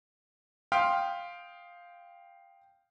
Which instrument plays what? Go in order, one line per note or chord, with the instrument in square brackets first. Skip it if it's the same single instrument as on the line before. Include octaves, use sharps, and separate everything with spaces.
[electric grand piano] F5 G5 C6 D#6 F6 B6